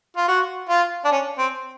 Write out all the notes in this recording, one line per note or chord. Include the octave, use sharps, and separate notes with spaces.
F4
F#4
F4
D4
C#4
C4